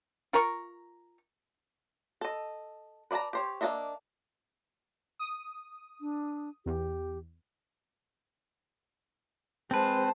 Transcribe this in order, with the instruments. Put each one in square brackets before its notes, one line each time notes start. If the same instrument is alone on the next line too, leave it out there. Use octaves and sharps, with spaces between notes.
[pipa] F4 A#4 A#5 C#6
[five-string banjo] A4 D#5
B4 D5 E5 A5 A#5
G4 C5 C#5
A#3 D4 F#4 D#5 E5
[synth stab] D#6
[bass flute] D4
[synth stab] E2 [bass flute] G4
[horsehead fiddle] G#3 C5 [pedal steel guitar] C4 B4 [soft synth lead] A5